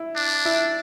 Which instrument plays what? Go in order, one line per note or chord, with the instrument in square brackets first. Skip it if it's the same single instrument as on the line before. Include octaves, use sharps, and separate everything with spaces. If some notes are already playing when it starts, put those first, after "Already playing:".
Already playing: [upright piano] E4
[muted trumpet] D4
[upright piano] E4